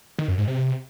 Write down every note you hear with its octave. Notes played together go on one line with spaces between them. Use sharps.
D#3
F#2
G#2
C3